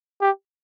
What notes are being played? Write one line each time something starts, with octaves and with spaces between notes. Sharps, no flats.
G4